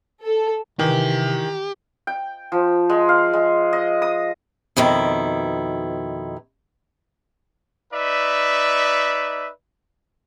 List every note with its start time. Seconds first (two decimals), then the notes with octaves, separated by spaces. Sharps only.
0.24 A4
0.79 C3 D#3 E3 G4
2.07 G5
2.52 F3
2.90 G#3
3.09 F5
3.33 G#3
3.73 D#5
4.02 D#6
4.77 F2 B2 D#3 E4
7.93 D#4 B4 D5 E5